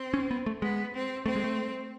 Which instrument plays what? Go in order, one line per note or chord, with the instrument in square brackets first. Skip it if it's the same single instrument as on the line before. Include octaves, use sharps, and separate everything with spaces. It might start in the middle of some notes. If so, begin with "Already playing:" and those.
Already playing: [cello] C4
[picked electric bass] C#4
B3
A3
[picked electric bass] G#3 [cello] B3
[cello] C4
[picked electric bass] A3 [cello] C4
[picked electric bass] G#3
A3